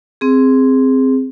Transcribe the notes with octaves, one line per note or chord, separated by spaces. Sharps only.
C4 G#4